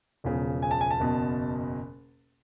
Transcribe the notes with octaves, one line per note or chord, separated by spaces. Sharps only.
E1 E2 C#3 F3
G#5
A5
G#5
A5
F#1 E2 B2